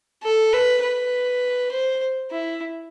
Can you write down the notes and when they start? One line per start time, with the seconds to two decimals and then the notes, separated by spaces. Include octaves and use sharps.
0.23 A4
0.53 B4
0.82 B4
1.72 C5
2.31 E4